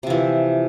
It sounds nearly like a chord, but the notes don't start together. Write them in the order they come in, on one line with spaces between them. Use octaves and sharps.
C3 F3 E3